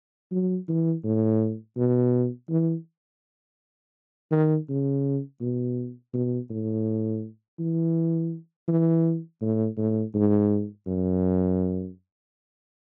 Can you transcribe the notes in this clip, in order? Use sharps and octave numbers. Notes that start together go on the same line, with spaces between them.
F#3
E3
A2
B2
E3
D#3
C#3
B2
B2
A2
E3
E3
A2
A2
G#2
F#2